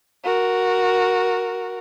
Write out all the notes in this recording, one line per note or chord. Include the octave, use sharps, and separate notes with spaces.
F#4 A#4